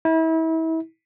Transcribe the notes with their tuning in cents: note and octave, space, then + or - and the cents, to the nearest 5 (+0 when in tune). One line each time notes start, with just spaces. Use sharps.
E4 -35